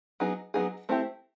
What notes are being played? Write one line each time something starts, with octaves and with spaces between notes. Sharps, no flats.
F#3 B3 D#4 G#4
F#3 B3 D#4 G#4
A3 C4 E4 G4